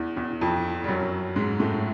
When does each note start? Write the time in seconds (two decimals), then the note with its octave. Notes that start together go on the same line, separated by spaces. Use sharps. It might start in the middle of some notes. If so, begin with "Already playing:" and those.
Already playing: E2 E3
0.17 E2 E3
0.41 F2 F3
0.84 G3
0.88 F#2 F#3
1.36 G#2 G#3
1.60 A2 A3